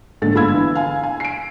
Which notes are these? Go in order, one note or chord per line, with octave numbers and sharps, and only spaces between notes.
A#1 G#2 D3 A4 A6
G1 F4 B5 E6 G#6
D3 E3
F5 G#5
G#5
C7 D7